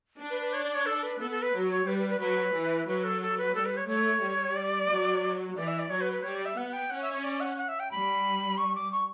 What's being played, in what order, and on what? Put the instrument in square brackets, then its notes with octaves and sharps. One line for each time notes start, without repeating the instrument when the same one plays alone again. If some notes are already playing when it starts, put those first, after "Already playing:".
[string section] D4
[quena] B4
B4
C#5
D5
C#5
A4
B4
[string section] B3 [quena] A4
[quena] A4
B4
[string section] F#3
[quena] C#5
[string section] G3 [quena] B4
[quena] B4
B4
[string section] F#3 [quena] B4
[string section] E3
[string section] F#3 [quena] B4
[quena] A4
A4
B4
[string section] G3 [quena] A4
[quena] B4
C#5
[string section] A3 [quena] C#5
[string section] G3
[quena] D5
[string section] F#3
[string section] E3 [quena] D5
[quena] E5
D5
[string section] F#3 [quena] C#5
[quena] B4
B4
[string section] G3 [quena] C#5
[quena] D5
E5
[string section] B3 [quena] F#5
[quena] F#5
G5
[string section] C#4 [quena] F#5
[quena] E5
C#5
D5
F#5
F#5
E5
G5
[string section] G3 [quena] B5
[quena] C#6
D6
C#6